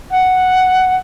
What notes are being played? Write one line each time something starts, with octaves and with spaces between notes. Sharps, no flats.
F#5